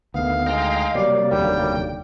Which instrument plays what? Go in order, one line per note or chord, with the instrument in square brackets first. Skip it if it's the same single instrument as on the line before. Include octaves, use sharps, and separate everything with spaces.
[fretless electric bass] D2 D#3 A3 [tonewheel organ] B3 [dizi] F5
[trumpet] G#3 [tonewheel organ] D#5 G5 A#5
[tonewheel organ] C3 F#3 A#3 [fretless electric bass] G3 [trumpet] D5
[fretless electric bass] F1 D#2 D3 [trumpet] G3 [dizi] G5